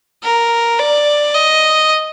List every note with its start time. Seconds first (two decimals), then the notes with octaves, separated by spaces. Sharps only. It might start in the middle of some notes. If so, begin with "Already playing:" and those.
0.24 A#4
0.79 D5
1.34 D#5